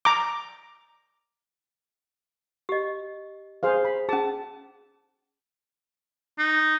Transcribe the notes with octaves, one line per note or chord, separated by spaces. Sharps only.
A#5 D6
G4 D#5
G#4 C5 F5
B5
C#4 G#4 A5
D#4